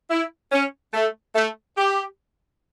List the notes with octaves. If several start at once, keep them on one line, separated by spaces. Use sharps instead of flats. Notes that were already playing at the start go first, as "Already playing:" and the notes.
E4
C#4
A3
A3
G4